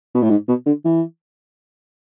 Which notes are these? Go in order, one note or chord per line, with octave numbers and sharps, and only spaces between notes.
B2
A2
G#2
B2
D3
E3